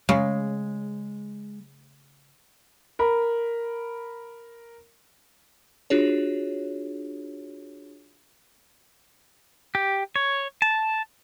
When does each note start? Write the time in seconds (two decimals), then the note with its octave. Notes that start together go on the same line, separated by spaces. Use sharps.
0.09 C#3 G#3
2.99 A#4 B5
5.90 D4 F4 F#4 G#4 C#5
9.75 G4
10.16 C#5
10.62 A5